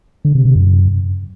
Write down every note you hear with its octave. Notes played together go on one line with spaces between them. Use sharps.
D3
C3
C3
F#2